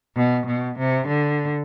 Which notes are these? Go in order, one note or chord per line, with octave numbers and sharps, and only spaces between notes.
B2
B2
C3
D3